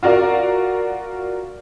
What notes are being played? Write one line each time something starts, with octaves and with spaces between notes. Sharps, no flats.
F4 F#4 A#4 D5 F5